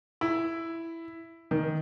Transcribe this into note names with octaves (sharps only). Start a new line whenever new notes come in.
E4
D#3